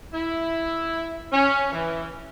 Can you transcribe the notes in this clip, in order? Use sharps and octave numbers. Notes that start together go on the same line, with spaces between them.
E4
C#4
E3